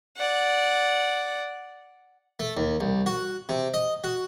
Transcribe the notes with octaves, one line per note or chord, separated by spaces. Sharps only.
D5 F#5
A3
D#2
C2
F#4
C3
D#5
F#4